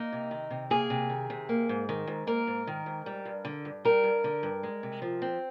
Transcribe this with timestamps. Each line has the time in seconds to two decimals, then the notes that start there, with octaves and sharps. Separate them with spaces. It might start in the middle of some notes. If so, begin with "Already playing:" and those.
Already playing: A#3 D#4
0.12 C3
0.31 D#3
0.51 C3
0.70 A#3 G#4
0.90 C3
1.10 D#3
1.30 C3
1.49 A#3
1.69 G#2
1.89 D#3
2.07 G#2
2.27 A#3 A#4
2.47 G#2
2.67 D#3
2.86 G#2
3.06 G3
3.25 G2
3.45 D3
3.65 G2
3.85 G3 A#4
4.04 G2
4.24 D3
4.43 G2
4.63 G#3
4.83 C3
5.02 F3
5.22 C4